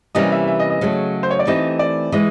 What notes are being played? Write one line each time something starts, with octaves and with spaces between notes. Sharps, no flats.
C3 E3 G3 A#3 C#4 D#5
E5
E5
D#5
D#5
C#3 F#3 A3
C5
C#5
D5
E3 A3 C4 D#4 G4 D#5
D5
E3 G#3 D#5